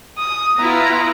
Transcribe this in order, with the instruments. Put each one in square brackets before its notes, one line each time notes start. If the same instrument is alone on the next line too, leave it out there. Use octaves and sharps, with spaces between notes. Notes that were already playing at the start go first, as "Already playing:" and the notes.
[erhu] D#6
[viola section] B3 E4 F4 [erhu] A#5